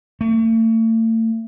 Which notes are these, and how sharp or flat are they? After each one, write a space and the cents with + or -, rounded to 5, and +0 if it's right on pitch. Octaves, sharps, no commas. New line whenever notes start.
A3 +40